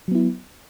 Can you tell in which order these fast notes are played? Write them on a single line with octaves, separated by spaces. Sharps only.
F#3 B3 E4